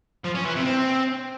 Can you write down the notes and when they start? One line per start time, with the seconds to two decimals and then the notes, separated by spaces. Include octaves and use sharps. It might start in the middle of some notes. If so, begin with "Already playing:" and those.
0.24 F3
0.35 C#4
0.45 E3
0.55 C3
0.65 C4